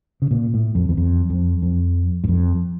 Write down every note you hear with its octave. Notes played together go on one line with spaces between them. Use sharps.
C#3
A#2
A2
F2
E2
F2
F2
F2
G2
F2